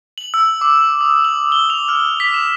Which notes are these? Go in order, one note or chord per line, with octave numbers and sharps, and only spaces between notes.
F#7
E6
D6
D#6
F#7
G7
F7
F6
B6
E7